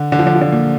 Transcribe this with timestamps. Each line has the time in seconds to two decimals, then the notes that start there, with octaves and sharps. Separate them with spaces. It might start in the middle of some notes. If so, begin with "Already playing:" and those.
Already playing: D3
0.12 D3
0.19 F3
0.27 D3
0.35 F3
0.41 D3
0.52 A#2